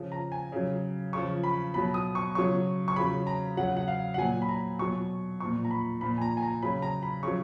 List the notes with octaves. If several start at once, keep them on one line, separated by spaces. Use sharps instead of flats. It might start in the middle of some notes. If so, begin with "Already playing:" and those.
Already playing: C#3 F3
A#5
G#5
C#3 F#3
C#3 F3 C#6
B5
B2 F#3 B5
D#6
C#6
C#3 F#3 C#6
C#6
C#3 F#3 B5
A#5
C#3 F#3 F#5
F#5
F5
F#5
A#2 F#3 G#5
B5
A#5
B2 F#3 C#6
A#2 F3 C#6
A#5
B5
A#2 F3 B5
G#5
A#5
G#5
A#5
C#3 F#3 B5
A#5
B5
C#3 F#3 C#6